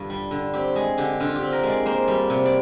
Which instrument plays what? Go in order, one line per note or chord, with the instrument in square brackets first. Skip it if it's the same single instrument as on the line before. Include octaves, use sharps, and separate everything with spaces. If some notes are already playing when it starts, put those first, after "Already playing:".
Already playing: [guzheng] G2 D3 F4
G3
D3
C4 G4
G#3 G#4
D3 G4
D3 F4
G4
C4
A#4
G#3
D5
A#3 C5
G3
C3
D5